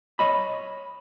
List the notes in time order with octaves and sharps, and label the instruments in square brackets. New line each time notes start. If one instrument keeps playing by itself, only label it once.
[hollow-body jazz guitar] C#5 D#5 B5